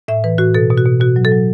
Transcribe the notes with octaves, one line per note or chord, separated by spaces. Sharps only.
A2 E5
E3 B4
A2 F#4
B2 A4
B2
F#4
B2
B2 F#4
F#3
A4
F#3